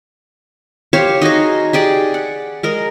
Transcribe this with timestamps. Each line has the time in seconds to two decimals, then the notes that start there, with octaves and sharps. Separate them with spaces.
0.93 G4 C5 C#5 F5
1.22 D#4 F#4 G#4 D#5
1.73 G4 G#4 D5 D6
2.14 F#5
2.63 G#3 A#4 D#5